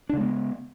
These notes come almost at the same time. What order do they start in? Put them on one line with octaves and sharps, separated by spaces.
D4 C#3 G#3 B3